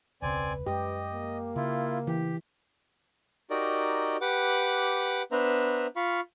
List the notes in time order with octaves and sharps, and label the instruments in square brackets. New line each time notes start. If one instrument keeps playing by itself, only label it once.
[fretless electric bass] E1 C#2 C#3 [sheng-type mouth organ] C4 D5 G#5 [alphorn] B4
[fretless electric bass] F#2 G#3 [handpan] G4 [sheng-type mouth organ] D#5
[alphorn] A#3
[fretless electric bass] C#3 [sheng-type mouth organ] E4 F4
[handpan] E3 [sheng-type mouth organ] G4
[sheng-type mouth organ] D#4 F#4 G4 A#4 D5 D#5
G4 B4 F#5 D6
B3 D4 B4 C5 E5 A#5
F4 F5 B5 C#6